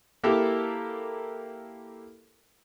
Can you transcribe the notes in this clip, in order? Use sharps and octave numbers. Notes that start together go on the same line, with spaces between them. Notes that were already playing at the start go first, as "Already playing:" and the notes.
A#3 E4 G4 A4 A#4